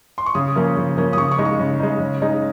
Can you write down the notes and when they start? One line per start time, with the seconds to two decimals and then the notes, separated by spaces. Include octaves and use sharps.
0.18 C6
0.26 C#6
0.35 C#3 D#6
0.56 F3 A#3 C#4
0.76 C#3
0.97 F3 A#3 C#4
1.13 D#6
1.17 C#3 C#6
1.31 C#6
1.38 G#3 D#4
1.45 C#6
1.59 C#3
1.80 G#3 D#4
2.00 C#3
2.22 G#3 D#4